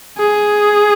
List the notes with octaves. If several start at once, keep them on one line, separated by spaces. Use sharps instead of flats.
G#4